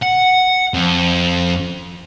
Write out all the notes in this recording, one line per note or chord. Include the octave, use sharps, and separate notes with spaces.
F#5
F2